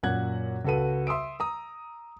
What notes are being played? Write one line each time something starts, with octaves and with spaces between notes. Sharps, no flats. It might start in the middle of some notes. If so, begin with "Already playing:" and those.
F#2 A#2 F#5 F#6 G#6
C#2 F#4 A4 B4 D#7
E5 C6 D#6 E6 D7
A#5 D#6